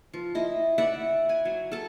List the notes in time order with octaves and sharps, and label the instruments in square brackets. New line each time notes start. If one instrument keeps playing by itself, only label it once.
[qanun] F3
E4 D#5
D5 E5 F#5 B5
G#5
F#3
A4 A5